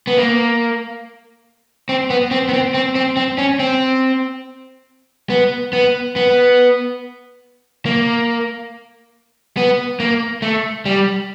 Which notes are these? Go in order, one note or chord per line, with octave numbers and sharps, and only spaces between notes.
B3
A#3
C4
B3
C4
B3
C4
C4
C4
C4
C#4
C4
B3
B3
B3
A#3
B3
A#3
A3
G3